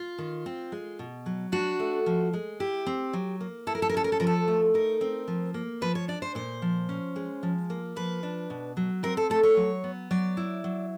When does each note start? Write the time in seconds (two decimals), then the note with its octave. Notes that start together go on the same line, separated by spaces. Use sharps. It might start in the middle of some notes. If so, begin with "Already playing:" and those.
Already playing: F4
0.18 D#3
0.46 C4
0.72 G#3
0.99 B2
1.26 F#3
1.52 D4 F#4
1.79 A3
2.06 F3
2.33 G#3
2.60 E4 G4
2.86 C4
3.13 F#3
3.41 A#3
3.67 E4 A4
3.75 A#4
3.82 A4
3.89 A#4
3.94 C#4 A4
4.04 A#4
4.12 A4
4.20 F3 A#4
4.27 A4
4.48 A3
4.74 D#4 A#4
5.01 C4
5.28 F3
5.54 A#3
5.81 F3 B4
5.95 C#5
6.08 D4 D5
6.22 C5
6.35 A#2 C5
6.62 F3
6.89 C#4
7.16 G#3
7.43 F3
7.70 A#3
7.96 F3 B4
8.23 D4
8.50 B2
8.77 F#3
9.03 C4 A#4
9.17 A4
9.30 A3 A4
9.43 C#5
9.57 F#3
9.84 B3
10.11 F#3 D5
10.37 E4
10.64 F#3